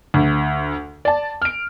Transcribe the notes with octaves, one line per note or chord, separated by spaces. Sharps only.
D2
D5 A5
F6 D7